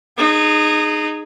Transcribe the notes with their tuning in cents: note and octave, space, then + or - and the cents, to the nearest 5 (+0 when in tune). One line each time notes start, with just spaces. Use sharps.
D#4 -25 G#4 +0